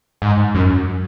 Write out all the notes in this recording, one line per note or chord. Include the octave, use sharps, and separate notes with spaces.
G#2
F#2